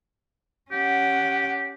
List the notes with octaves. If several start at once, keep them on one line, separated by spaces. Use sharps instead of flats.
C#4 G4 F#5